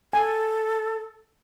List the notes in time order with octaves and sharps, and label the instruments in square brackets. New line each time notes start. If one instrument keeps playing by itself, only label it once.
[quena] A4 [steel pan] G#5